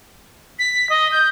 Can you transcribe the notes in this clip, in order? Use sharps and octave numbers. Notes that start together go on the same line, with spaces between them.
B6
D#5
G6